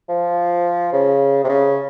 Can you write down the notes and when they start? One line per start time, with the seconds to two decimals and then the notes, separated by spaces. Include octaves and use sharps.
0.09 F3
0.92 C#3
1.44 C3
1.49 C#3